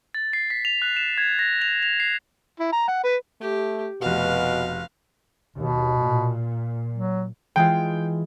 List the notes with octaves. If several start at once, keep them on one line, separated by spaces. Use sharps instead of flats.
A6
C7
B6
F7
F#6
E7
G#6
A#6
F7
F7
C7
E4
A#5
F#5
B4
A3 G4
F1 B2 F#4 F5
D#2 B2
A#2
F#3
E3 G#3 F4 G5